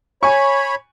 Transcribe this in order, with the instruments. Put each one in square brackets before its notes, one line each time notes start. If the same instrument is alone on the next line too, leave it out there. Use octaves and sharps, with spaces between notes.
[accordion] C#5 B5 [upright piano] G#5 C#6